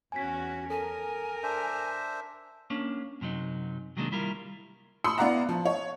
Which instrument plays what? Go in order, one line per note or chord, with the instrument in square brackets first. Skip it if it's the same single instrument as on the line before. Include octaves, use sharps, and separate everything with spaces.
[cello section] E2 C#4 F#4 [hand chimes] G#5 B6
[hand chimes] A4 [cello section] A#4 [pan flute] G#5
[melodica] D4 C5 E5
[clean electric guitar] A#3 C#4 D4
F#2 C3 F#3 D#4
C3 D#3 F#3 G#3 A#3 D4
G3 E4 F4 A#4
[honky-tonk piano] B5 C6 D#6 E6 C#7
B3 E4 D5 F5 F#5 A#5
F3
C#5